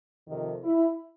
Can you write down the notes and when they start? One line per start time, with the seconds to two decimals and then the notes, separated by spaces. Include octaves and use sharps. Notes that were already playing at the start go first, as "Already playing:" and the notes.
0.28 F2 C3 D#3
0.64 E4